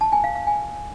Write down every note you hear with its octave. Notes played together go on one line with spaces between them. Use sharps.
A5
G#5
F5
F5
G#5